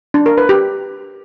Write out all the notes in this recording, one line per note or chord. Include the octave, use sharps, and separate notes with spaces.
D4
A#4
B4
G4